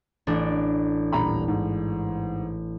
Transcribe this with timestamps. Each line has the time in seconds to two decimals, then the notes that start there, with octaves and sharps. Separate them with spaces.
0.27 A1 D4
1.13 D#1 A#5 B5
1.48 G#2